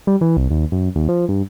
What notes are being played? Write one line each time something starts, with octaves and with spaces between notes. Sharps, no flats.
G3
E3
C2
D#2
F#2
D#2
F3
G2